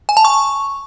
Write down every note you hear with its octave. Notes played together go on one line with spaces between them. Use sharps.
G#5
A5
C#6